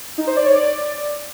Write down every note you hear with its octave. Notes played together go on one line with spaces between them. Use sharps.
D#4
C5
D5
C#5
D5